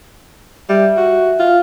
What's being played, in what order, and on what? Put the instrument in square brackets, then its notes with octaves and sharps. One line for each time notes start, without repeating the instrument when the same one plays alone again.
[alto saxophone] G3 [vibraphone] E5
[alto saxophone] F#4
F4